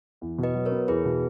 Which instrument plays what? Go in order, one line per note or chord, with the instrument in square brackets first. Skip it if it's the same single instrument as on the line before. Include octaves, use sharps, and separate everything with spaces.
[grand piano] E2
B2
[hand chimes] B4 D#5
[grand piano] F#3
[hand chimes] A#4 C#5
[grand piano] B3
[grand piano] E2 [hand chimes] G#4 B4
[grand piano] B2